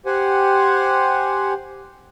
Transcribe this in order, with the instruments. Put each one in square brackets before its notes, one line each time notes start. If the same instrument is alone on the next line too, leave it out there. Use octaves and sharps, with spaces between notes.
[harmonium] G4 C5 F#5 G#5